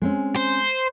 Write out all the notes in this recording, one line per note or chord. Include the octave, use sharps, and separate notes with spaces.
G#3 C4 C#4
C5